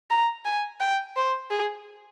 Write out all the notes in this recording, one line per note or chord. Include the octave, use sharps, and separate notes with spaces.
A#5
G#5
G5
C5
G#4